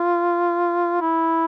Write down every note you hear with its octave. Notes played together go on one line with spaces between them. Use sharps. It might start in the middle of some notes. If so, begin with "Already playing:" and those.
Already playing: F4
E4